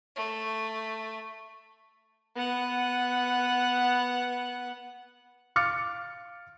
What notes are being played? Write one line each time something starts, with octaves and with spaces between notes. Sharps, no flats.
A3
B3 F#5
F5 D6 F6 A6 C#7